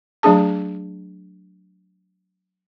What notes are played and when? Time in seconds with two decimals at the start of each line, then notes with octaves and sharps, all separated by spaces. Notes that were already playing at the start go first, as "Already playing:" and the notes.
0.23 F#3 A3 D4 G#4 A5